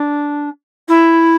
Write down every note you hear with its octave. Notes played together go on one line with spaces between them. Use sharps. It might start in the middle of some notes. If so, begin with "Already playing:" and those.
Already playing: D4
E4